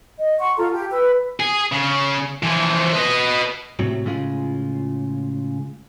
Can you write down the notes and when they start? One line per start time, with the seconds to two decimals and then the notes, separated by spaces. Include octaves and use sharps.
0.18 D#5
0.39 F#5 C6 C#6
0.57 F4 A4 A#5
0.73 G4
0.91 B4 E6
1.40 G#4
1.72 C#3
2.43 E3 F3
2.93 B4 D#5
3.79 A2 C3 F#3
4.05 A2 C#3 G#3 F4